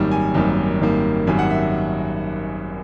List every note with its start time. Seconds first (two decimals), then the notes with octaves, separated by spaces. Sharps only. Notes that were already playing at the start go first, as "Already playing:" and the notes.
Already playing: G#1 F#2 D#3 G3 A#3
0.11 G#5
0.34 G#1 F#2 D#3 G3 A#3
0.81 G#1 F#2 D#3 G3 A#3
1.27 G#1 F#2 D#3 G3 A#3 G#5
1.39 F#5
1.50 E5